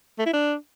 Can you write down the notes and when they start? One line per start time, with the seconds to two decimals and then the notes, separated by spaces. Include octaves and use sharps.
0.19 A3
0.26 E4
0.33 D4